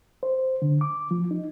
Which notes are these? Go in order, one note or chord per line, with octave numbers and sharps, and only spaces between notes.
C5
D3
D6
F3
D#4